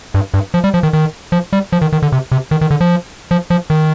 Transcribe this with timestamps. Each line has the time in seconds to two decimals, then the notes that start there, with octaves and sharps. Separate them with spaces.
0.14 G2
0.34 G2
0.54 F3
0.64 G3
0.74 F3
0.83 D#3
0.93 D#3
1.32 F3
1.53 G3
1.72 F3
1.82 D#3
1.93 D#3
2.03 D3
2.12 C3
2.32 C3
2.51 D#3
2.61 D#3
2.71 D3
2.81 F3
3.31 F3
3.50 F3
3.70 D#3